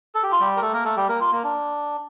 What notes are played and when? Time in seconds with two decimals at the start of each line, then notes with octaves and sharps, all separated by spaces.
0.15 A4
0.23 G4
0.32 F4
0.40 G3 G4
0.57 A#4
0.62 A3 A4
0.73 A#3 A#4
0.85 A3 A4
0.97 G3 G4
1.09 A#3 A#4
1.20 F4
1.32 A#3
1.44 D4